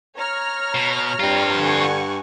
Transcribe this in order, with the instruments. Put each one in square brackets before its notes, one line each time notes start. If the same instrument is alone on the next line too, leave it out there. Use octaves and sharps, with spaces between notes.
[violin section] C#5 A#5 F6
[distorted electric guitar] B2
[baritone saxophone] G2 [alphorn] G3 [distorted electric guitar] C4 F4
[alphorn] D3 [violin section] F#5 G#5 C#6